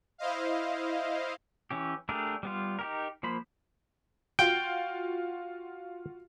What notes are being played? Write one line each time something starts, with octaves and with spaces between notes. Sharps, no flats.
E4 C5 D#5 F5
E3 C#4 G4
A3 D4 G4 G#4 A#4
G3 B3 F4
D#4 G4 A#4
F3 A#3 C5 B5
F4 F#4 G5